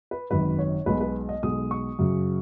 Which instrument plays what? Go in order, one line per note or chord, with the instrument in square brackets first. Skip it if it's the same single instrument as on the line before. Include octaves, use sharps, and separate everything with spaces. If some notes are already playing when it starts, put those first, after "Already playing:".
[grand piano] B4
G#1 F#2 D#3 B4
C#5
B1 B2 G#3 B4
B4
D#5
B1 B2 G#3 D#6
C#6
F#2 C#3 F#3